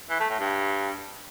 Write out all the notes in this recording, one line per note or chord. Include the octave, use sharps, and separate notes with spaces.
E3
A3
A2
G2